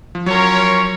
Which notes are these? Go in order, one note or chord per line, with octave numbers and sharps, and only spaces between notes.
F3
F#3 C#4 F4 A#4 C#5